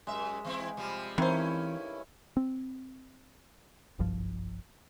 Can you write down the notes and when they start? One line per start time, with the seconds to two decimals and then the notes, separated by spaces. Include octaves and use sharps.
0.07 F#2 G#3 E5
0.45 E3 C4 E4
0.77 C3 F3 G3
1.18 G2 D#3 E3 C4 C#4 E4 C5
2.37 C4
3.99 F#1 B1 G2 F3